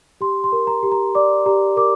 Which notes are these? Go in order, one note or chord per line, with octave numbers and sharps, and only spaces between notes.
G4 C6
C6
A#4
A#5
G4
A#5
D5 D6
G4 A#5
A#4 D6